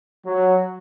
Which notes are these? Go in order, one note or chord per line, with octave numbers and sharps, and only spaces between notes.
F#3